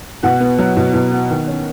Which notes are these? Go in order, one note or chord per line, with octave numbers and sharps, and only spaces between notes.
B2 F#4 F#5
B3
F#3
B2
B2
B3
D#3
C#4